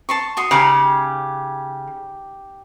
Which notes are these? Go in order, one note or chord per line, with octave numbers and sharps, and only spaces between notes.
A5 C6 C#6
F#4 C6 D#6
C#3 D#4 G4 A#5